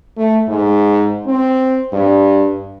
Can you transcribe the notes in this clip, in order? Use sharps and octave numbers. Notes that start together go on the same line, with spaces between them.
A3
G#2
C4
G2